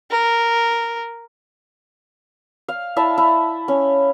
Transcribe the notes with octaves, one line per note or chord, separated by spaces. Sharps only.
A#4
F5
E4 E5 F5 A5
E4
C#4